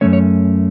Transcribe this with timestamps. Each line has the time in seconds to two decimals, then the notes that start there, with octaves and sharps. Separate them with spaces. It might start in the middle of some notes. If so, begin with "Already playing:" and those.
0.01 F#2 E3 A3 C#4 C#5
0.13 C#5